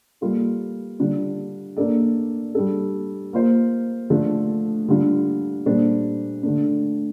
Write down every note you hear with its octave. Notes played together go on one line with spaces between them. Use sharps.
G3 A#3 F4 A4
D3 G3 D4 F4
A#3 D4 A4 D5
G3 D4 A4
A#3 F4 C5
D3 F3 A3 D4 A4
D3 G3 D4 F4
A#2 G3 D4 A4 C5
D3 A3 D4